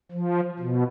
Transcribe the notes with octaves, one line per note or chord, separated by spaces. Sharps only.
F3
B2